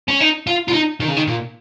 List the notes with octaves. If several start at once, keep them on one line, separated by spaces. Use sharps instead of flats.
C#4
D#4
F4
F4
D#4
D#3
C#3
D#3
A#2